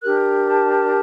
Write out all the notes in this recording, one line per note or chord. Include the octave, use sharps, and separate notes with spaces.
D4 G4 A#4 F#6
A5